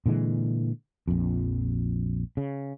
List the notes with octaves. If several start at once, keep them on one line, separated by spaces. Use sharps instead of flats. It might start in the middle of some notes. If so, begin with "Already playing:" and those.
A#2 D3 E3 G#3
A#1 F2
C#3